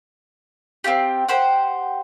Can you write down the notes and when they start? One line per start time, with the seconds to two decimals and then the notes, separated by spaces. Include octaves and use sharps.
0.84 C4 E4 F4 G4
1.28 G4 C5 F#5